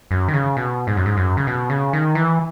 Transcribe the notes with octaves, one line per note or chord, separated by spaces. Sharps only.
F#2
D#3
C#3
B2
G#2
F#2
G#2
F#2
C#3
B2
C#3
D#3
E3